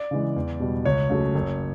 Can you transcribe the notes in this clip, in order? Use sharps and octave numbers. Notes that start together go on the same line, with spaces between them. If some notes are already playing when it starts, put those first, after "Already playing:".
Already playing: D5
C#3 E3 G#3
E2
B2 G3
C#2 C#5
C#3 F#3 A3
F#1